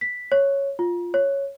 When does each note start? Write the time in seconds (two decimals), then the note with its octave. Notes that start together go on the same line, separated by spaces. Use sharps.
0.01 B6
0.32 C#5
0.79 F4
1.14 C#5